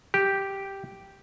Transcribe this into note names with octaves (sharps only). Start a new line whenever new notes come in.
G4